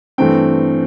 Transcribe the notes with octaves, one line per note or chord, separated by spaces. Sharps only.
G2 E3 A3 C4 G5